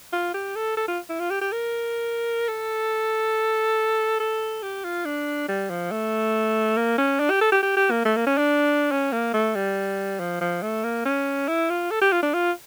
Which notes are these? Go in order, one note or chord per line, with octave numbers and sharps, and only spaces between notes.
F4
G4
A4
A4
F4
E4
F4
G4
G4
A#4
A4
A4
G4
F4
D4
G3
F3
A3
A#3
C#4
D4
G4
A4
G4
G4
G4
A#3
A3
A#3
C#4
D4
C#4
A#3
A3
G3
F3
F3
A3
A#3
C#4
E4
F4
A4
G4
F4
D4
F4